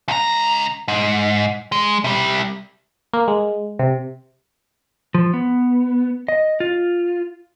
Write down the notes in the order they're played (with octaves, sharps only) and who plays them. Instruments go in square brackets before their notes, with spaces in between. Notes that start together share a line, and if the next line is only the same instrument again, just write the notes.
[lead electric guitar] C#2 A#5
G#2
G#3
C3 G3
[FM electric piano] A#3
G#3
C3
[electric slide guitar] F3
B3
D#5
F4